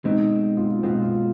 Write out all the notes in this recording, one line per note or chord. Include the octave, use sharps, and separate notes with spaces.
B1 B2 G#3 C4 D#4
F4
B1 B2 G#3 C4 F4
F4